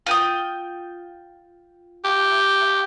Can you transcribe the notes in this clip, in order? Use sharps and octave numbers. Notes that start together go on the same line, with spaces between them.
F4 G5 D#6
G4